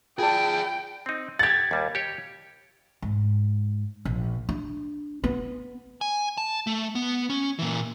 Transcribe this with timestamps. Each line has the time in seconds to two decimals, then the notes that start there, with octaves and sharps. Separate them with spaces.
0.19 F4 G#4 D5 G5 A5
1.06 C4 D#4
1.39 G4 F#5 G#6 A6
1.71 D#2 G3
1.95 G4 C#5
3.02 G#2
4.05 A#1
4.49 D4
5.24 B3
6.01 G#5
6.38 A5
6.67 A3
6.95 B3
7.30 C#4
7.59 A#2 E3